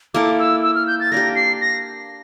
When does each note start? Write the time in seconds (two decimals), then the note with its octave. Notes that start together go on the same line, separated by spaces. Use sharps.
0.14 A#3 E4 A4 D6
0.39 E6
0.63 E6
0.75 F6
0.87 G6
1.00 A6
1.12 A#3 D4 G4 A#6
1.36 C7
1.61 A#6